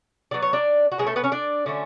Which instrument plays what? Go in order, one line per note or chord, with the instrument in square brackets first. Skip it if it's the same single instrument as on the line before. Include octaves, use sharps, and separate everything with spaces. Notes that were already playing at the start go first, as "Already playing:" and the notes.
[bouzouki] D3 F#3 B3 D5
C#5
D4 D5
F#4
B2 F#3 G#3 C#4 G#4
A3 A4
B3 B4
C#4 C#5
D4 D5
D3 F#3 A3 C#4